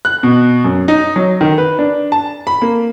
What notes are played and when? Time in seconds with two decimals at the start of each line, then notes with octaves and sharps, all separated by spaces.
0.05 F#6
0.23 B2
0.64 F#2
0.88 D#4
1.16 F#3
1.41 D#3
1.58 B4
1.79 D4
2.12 A5
2.47 B5
2.62 A#3